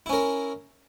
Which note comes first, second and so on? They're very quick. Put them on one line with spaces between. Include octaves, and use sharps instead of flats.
E4 C#4 A#4